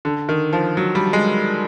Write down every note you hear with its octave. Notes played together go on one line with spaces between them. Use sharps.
D3
D#3
F3
F#3
G3
G#3